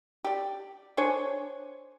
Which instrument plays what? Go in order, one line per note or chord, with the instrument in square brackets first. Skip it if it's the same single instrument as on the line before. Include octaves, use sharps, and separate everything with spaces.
[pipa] G4 D5
D4 C5 C#5 G#5